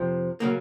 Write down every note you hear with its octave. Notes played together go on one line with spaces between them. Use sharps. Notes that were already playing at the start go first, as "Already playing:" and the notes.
Already playing: F2 C3 F3
C#3 F#3 A#3